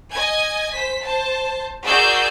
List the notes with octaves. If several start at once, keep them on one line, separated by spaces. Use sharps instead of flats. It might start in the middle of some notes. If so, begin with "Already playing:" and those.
D#5 G#5 G#6
C5 B6
C5 A5
F#4 G#4 A#4 D5 E6 G6